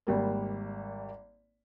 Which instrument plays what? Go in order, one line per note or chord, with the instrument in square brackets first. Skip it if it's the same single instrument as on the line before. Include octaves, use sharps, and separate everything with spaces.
[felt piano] G#1 G3 A#3